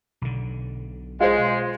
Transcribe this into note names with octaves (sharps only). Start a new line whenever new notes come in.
B1 D3
G#3 F4 C5